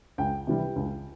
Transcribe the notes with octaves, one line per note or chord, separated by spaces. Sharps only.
C#2 G5
C3 E3 G3
C#2